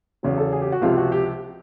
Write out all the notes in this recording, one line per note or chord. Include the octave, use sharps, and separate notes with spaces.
E2 C#3 F#3
A4
G#4
G4
F#4
C#2 C3 F3 F4
F#4
G4